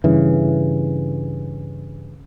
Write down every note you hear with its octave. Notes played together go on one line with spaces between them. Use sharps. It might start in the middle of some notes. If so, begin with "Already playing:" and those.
G2 C#3 E3